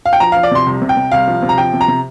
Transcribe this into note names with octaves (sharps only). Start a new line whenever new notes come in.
F5
G5
F3 A#5
F3 F5
D5
C3 C6
C2
C3
G5
C3
C2 F5
F3
C3
A#5
F3 G5
C3
A#5
C3